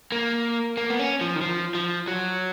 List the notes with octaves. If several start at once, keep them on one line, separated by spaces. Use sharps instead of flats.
A#3
A#3
B3
C#4
F3
D#3
F3
F3
F#3